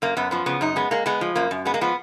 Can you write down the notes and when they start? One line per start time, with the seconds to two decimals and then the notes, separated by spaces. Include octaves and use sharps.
0.02 F#2 A#3
0.17 F#2 B3
0.31 F3 B3
0.46 C#3 B3
0.61 F#2 D#4
0.76 G#3 B3
0.91 G#3 A#3
1.06 G#3 B3
1.21 F3
1.36 F#2 A#3
1.51 F#2
1.65 G#3 B3
1.74 A#3
1.81 F3 B3